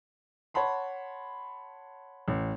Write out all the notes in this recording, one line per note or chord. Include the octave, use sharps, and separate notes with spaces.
C#5 F#5 A5 B5 C6
A1